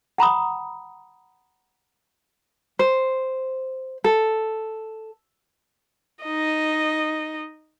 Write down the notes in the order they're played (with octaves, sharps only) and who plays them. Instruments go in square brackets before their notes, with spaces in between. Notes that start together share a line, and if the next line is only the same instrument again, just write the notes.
[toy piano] F#5 A#5 B5 D#6
[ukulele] C5
A4
[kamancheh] D#4 D#5